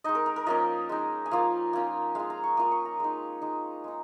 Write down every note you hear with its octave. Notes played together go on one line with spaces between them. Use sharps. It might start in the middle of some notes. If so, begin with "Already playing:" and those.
G#3 D#4 D#5
A#4
A#4
A#4
F3 A#3 C#4 D#5
G#3 D#4
G#5
F3 A#3 F4 F5
A#3 C#4 F4
G#3 F4 F5
A#5
C#6
A#3 F4 D#6
C#6
A#5
G#3 D#4
G#3 D#4
G#3 D#4